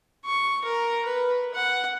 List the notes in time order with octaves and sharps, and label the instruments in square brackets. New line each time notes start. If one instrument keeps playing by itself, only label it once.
[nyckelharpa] C#6
A#4
B4
F#5